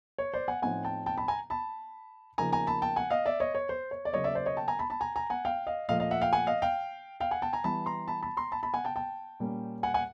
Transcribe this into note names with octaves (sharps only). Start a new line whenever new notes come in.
C#5
C5 D5
F#5 G#5
A2 F3 A3 C4 D#4 F#5 G#5
G5 A5
G5 A5
A5 B5
G#5 A#5
A5 B5
C#3 F3 A#3 D#4 G#5 A#5
G#5 A#5
A5 B5
G5 A5
F#5 G#5
D#5 F5
D5 E5
C#5 D#5
C#5
C5
C#5
D5
C#3 F#3 A#3 C#5 D#5
D5 E5
C5 D5
C#5 D#5
G5 A5
G#5 A#5
A5 B5
A5 B5
G#5 A#5
G#5 A#5
F#5 G#5
F5 G5
D#5 F5
A#2 F3 A3 D#5 F5
D#5 F5
E5 F#5
F5 G5
F#5 G#5
D#5 F5
F5 G5
F5 G5
F#5 G#5
G5 A5
G#5 A#5
E3 G3 B3 A5 B5
A#5 C6
A5 B5
A5 B5
A#5 C6
A5 B5
A5 B5
F#5 G#5
G5 A5
G5 A5
A#2 G3 A#3 C#4
F#5 G#5
F#5 G#5